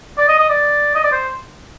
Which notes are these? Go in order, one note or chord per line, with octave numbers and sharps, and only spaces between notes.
D5
D#5
D#5
D5
D#5
D5
C5